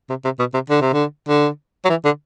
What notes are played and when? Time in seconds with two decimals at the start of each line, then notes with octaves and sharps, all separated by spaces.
0.09 C3
0.24 C3
0.39 B2
0.54 C3
0.70 D3
0.81 C3
0.93 D3
1.29 D3
1.85 F#3
1.90 E3
2.05 D3